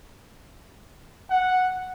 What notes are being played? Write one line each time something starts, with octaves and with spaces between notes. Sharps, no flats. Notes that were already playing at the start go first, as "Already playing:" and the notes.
F#5